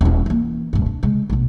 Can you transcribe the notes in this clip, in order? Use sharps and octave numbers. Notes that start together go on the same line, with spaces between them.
D#1 E4
E3 A#3
D1 G2
D4
C#3 G#3
A#1 B2